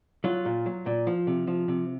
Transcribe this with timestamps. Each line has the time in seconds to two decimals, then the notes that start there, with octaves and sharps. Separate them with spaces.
0.24 F#3 F4
0.45 A#2
0.66 F#3
0.86 A#2
1.07 F3
1.27 C3
1.47 F3
1.68 C3